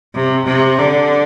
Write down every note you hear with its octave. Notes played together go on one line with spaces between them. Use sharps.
C3
C3
D3